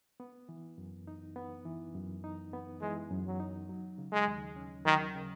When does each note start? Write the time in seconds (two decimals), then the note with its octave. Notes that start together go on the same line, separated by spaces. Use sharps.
0.20 B3
0.49 E3
0.78 F#2
1.07 D#4
1.36 B3
1.65 E3
1.94 F#2
2.24 D#4
2.53 B3
2.81 E3 G#3
3.10 F#2
3.26 F#3
3.40 D#4
3.69 F#3
3.98 C#3
4.12 G#3
4.27 D#2
4.56 C#4
4.85 D#3 F#3
5.15 C#3